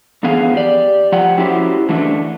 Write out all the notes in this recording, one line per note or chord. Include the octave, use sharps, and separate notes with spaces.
F2 D3 E3 B3 G#4 F5
G4 D5
F3 G4 F#5 G5
C#4 E4 F#4 G4 C5
D3 E3 A3 D4